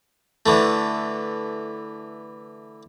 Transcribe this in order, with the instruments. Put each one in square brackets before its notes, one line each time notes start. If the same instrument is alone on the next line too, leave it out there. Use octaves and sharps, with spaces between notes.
[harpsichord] D3 E3 A3